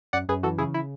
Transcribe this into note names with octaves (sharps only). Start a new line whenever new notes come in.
F#2 D5 F#5
F#2 G#4 B4
E3 F#4 A4
C#3 E4 G#4
E4